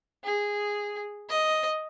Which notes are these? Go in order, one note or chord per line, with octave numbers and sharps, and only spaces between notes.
G#4
D#5